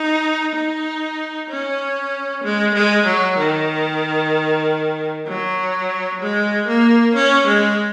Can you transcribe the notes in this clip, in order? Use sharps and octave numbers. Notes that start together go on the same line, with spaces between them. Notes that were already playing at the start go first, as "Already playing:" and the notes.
Already playing: D#4
D#4
C#4
G#3
G#3
F#3
D#3
F#3
G#3
A#3
C#4
G#3